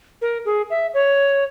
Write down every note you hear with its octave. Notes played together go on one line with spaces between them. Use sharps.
A#4
G#4
E5
C#5